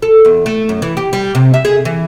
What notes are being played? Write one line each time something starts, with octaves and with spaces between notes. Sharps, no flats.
A4
E2
A3
F#2
E3
G4
G3
C3
E5
G#4
E3